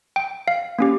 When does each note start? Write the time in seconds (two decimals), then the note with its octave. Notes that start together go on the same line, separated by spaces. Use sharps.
0.16 G5
0.48 F5
0.79 A#3 C#4 G4